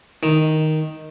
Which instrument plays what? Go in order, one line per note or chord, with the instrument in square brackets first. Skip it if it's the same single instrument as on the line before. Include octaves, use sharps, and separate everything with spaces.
[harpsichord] D#3